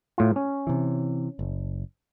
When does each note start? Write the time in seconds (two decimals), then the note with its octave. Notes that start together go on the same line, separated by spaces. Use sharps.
0.18 A2 F4
0.36 C#4
0.67 C3 E3
1.39 F#1